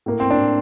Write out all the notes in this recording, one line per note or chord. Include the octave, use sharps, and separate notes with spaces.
A2 A#3
A2 C4
D4
A2